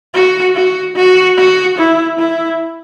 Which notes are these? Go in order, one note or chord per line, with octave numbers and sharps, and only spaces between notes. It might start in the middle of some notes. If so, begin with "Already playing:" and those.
F#4
F#4
F#4
F#4
E4
E4